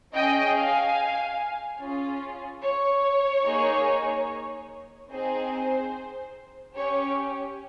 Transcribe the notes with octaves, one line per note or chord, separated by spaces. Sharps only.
C#4 G#4 D#5 G5
F5 G#5
C#4 F4 G#4
C#5
A#3 D#4 G#4
C4 D#4 G#4 C5
C#4 G4 C#5